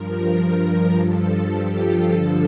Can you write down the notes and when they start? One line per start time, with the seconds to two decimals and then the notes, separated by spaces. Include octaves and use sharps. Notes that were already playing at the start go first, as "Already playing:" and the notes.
Already playing: G2 F3 A#4
0.96 G2 F3 A4
1.53 G4
1.81 F4
2.09 G2 D3 F3 A4